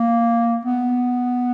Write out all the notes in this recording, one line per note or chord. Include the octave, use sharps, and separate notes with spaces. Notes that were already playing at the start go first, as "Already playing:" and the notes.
Already playing: A#3
B3